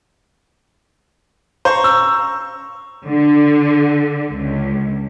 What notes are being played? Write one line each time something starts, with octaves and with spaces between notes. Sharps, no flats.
C5 A#5 C#6
E6
D3
C#2